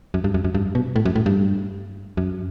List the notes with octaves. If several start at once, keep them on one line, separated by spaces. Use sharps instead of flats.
F#2
G2
F#2
F#2
G2
B2
A2
F#2
A2
G2
F#2